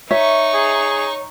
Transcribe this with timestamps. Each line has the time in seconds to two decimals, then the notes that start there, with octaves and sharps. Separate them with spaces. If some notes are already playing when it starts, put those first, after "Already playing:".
0.11 D#4 C#5 E5 C#6
0.54 G#4